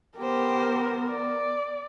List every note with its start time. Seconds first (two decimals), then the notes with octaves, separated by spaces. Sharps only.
0.18 B3 G4 A#4 C5
1.09 D5